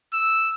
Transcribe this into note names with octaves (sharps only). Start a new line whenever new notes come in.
E6